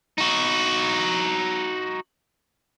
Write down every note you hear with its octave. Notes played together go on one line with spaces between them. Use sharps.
D#4 F#4